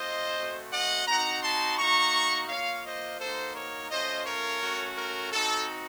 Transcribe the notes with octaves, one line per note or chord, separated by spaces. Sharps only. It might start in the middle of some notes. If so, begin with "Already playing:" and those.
Already playing: A3 C4 F4 C5 D#5
A3 C4 F#4
D#5 F#5
C4 D#4 F#4 F#5 A#5
A5 C6
A#3 D#4 F#4 A#5 C#6
A#3 F4 C#5 F5
C5 D#5
A#3 D#4 F#4 A4 C5
A#4 C#5
A3 C#4 F4 C5 D#5
A#4 C#5
A3 C#4 F#4
A#4
C4 D#4 F#4 A4